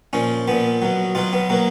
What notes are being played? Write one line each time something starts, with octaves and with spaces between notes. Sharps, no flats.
A#2 F3 C#4
A#2 F3 B3
B2 F#3
B2 F#3 F4
B3
B2 F#3 A#3